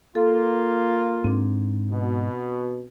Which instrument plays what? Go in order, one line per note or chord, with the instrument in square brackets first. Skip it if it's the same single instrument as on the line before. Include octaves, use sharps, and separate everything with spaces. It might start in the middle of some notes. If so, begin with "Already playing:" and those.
[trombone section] A#3 F4 [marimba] A4
[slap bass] G#2 [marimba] C4 D4
[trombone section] B2